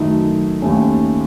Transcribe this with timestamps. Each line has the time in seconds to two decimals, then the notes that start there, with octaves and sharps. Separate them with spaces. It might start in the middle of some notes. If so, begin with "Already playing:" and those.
Already playing: F#2 D#3 A3 D#4
0.62 D#2 D#3 A3 C#4